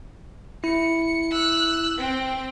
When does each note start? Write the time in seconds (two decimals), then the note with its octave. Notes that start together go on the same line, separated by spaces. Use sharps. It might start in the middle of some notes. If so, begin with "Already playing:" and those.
0.64 E4 C#7
1.32 E6 F#6
1.98 C4 G5